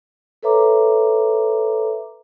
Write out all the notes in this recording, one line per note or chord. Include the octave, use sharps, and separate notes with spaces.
A4 B4 C#5 E5 A#5 D6